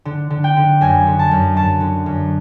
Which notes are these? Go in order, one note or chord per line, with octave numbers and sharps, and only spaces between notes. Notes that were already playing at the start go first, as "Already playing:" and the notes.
D3
D3
G5
D3
F#2 G#5
D3
A5
F#2
F#2 A5
D3
F#2